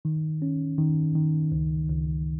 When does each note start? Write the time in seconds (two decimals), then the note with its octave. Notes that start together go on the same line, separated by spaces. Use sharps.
0.05 D#3
0.42 C#4
0.78 D#3
1.15 D#3
1.52 C#2
1.89 C#2